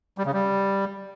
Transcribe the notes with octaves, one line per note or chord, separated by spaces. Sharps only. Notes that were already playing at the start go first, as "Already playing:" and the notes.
G3
C#3
G3